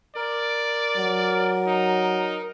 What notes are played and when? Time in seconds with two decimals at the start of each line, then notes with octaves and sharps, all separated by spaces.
0.16 A#4 D5
0.98 F#3
1.67 D#4